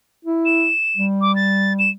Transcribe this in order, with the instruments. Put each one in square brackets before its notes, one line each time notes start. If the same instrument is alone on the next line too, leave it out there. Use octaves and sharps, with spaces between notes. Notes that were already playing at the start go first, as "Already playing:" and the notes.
[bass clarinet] E4
[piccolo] E7
[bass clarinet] G3
[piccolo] D6
A6
E7